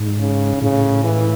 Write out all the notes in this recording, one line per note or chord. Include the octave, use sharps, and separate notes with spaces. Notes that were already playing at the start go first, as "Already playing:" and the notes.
Already playing: G#2
C#3
A2 C#3
E3